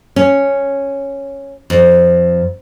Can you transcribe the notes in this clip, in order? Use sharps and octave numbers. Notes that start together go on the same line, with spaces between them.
C#4
F2